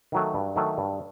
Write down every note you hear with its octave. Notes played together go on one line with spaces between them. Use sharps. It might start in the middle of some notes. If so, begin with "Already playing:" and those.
D#3 F#3 A3
G2
D#3 F#3 A3
G2